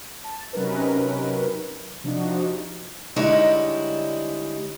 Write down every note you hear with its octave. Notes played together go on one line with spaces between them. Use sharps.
A5
C3 F#3 C#4 D#4 A#4 B4
C3 F3 D4 D#4 F#4
D3 G3 G#3 D#4 E4 C#5